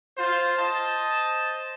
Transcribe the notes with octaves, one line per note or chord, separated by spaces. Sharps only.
F4 C5
C5 D#5 A5